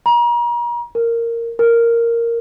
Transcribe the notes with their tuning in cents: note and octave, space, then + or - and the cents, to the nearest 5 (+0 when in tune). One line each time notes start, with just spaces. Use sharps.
A#5 +40
A#4 -10
A#4 -5